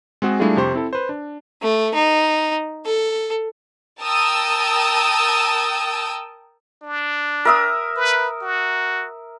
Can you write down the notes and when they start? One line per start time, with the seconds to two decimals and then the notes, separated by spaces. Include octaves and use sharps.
0.22 G#3 C4 F#4 G#4
0.40 G3 A3 D4 E4 F4 G#4
0.56 F2 C3 G4 C5 C#6
0.74 C4 E4 A4
0.93 B4 C5
1.09 D4
1.62 A3
1.94 D#4
2.85 A4
4.01 A#4 G5 A5 D#6 E6
6.82 D4
7.45 A#4 E5 D#6
7.97 B4
8.42 F#4